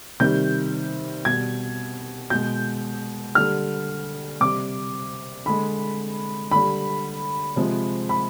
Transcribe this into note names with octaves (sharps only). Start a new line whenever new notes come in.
C3 D#3 G3 G6
B2 G3 G#6
B2 G#3 G6
D3 G3 F6
C3 G3 D6
D3 G#3 B5
D3 G3 B5
C3 F3 G#3
B5